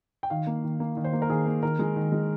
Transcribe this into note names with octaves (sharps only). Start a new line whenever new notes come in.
G5
D#3 F5
A#3
D#3
A#3
D#3
C5
A#3
A#4
D#3 G#4
A#3
D#3 A#4
G#3
D#3
G#3